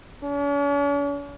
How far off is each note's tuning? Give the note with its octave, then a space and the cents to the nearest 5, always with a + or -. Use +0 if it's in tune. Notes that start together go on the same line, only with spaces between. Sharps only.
C#4 +45